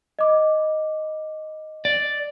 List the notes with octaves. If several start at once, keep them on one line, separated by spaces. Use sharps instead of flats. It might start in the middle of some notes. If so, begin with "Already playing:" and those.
D#5 D6
D5